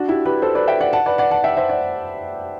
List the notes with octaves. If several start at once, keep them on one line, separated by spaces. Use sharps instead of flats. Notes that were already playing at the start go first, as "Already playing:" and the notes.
Already playing: D4 F#4
E4 G4
G4 B4
A4 C5
B4 D5
E5 G5
D5 F#5
F#5 A5
B4 D5
D5 F#5
F#5 A5
E5 G5
C5 E5
D5 F#5